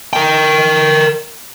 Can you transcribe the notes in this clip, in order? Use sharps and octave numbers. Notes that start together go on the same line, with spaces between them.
A#4 G5